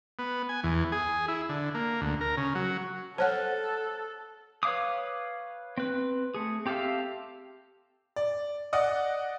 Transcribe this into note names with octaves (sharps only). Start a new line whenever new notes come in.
B3
G#5
E2
G#4
E4
D3
A#3
D2
A#4
C#3
F#3
A4 C5 C#5 F#5 A5 F6 F#6
B4 C#5 F5 D6 D#6
C4 B4
A3 G#4
C4 G4 A4 E5 F5
D5
D5 D#5 F#5 D#6